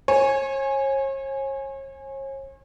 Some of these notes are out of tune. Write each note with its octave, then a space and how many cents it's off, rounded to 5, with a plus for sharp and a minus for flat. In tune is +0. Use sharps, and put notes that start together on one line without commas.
C#5 -40 G#5 +0